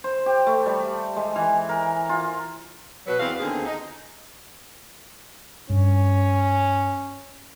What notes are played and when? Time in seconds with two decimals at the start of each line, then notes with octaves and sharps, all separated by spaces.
0.04 C5
0.26 G4
0.47 A3
0.66 G3
1.16 G#3
1.36 E3
1.69 A#4
2.09 F4
3.06 B2 F#3 B4
3.20 E2 C4 F#4 G#4 D5 F5
3.38 D#2 D3 B3 C4 G#4
3.65 D#4
5.70 G2 C#4